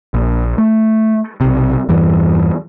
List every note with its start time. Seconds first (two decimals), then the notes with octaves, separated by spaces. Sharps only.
0.14 A#1
0.58 A3
1.41 B1 C3
1.89 E2 G2 E3